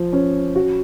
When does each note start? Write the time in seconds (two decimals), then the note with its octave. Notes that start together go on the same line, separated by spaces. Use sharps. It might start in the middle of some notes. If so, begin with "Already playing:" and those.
Already playing: F3
0.13 C#4
0.56 F#4